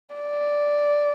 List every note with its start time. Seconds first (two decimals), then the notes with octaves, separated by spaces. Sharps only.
0.15 D5